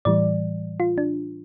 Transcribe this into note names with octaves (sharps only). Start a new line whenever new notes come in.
A2 E3 G3 D5
F4
D4